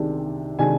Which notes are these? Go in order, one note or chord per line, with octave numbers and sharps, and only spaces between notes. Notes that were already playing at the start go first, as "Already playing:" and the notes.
Already playing: C2 C3 D#3 G#3 D4
C3 D#3 G#3 D4 G#5